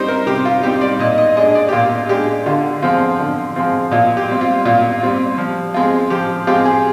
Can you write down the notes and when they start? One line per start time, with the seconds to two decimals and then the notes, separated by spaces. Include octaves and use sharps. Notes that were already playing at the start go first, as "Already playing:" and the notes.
Already playing: G3 C4 D#4 C5
0.08 A#4
0.27 C3 G4
0.45 F4
0.63 G3 C4 D#4 G4
0.81 D5
0.99 A#2 D#5
1.18 D#5
1.36 G#3 D4 D#5
1.55 D5
1.69 G4
1.72 A#2 F4
2.09 G#3 D4 G4
2.46 D3 F4
2.82 F3 G#3 C4 F4
3.19 D3
3.56 F3 G#3 C4 F4
3.91 A#2 F4
4.17 G4
4.28 G3 C4 F4
4.41 F4
4.65 A#2 F4
5.01 G3 C4 F4
5.38 F3
5.74 G#3 C4 F4
6.10 F3 G4
6.47 G#3 C4 F4 G4
6.65 G#4